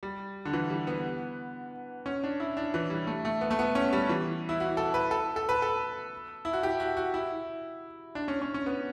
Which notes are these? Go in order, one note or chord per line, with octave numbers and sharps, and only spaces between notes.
G3
D3
E3
G3
B3
C#4
D4
E4
D4
E3
G3
A3
A3
B3
A3
B3
C#4
G3
E3
E4
F#4
A4
B4
A4
A4
B4
A4
E4
F#4
G4
F#4
F#4
E4
D4
C#4
C#4
C#4
B3